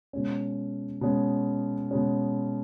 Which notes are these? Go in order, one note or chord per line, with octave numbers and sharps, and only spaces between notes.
B2 G#3 C#4
B2 G#3 C#4
B2 G#3 C#4